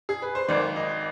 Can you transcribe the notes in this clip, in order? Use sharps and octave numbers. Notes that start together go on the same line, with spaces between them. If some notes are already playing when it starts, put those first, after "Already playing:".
G#4
B4
C5
G#1 G#2 D#3 D5
D#5